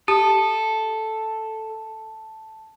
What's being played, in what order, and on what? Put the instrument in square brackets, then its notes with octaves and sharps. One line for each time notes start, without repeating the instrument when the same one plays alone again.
[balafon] G4 [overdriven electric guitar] A4 [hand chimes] A5